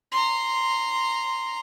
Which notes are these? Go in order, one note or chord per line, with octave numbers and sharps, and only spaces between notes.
A#5 C6